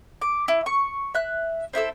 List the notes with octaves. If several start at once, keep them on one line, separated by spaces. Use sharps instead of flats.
D6
E4
C#6
E5 F#6
C4 E4 A4 E6